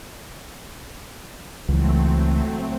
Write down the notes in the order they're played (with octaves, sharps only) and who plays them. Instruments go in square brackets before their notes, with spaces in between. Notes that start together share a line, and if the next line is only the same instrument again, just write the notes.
[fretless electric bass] C#2 E3 [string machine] F#3 A3 C4